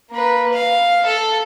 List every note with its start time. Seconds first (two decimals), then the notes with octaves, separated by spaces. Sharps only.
0.11 A#3 B4
0.53 F5
1.06 A4